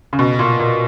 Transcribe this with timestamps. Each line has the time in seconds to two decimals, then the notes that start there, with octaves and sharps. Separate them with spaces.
0.13 C#3
0.19 B2
0.39 A#2
0.59 A#2